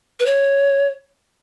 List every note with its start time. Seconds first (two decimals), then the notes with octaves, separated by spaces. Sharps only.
0.20 B4
0.26 C#5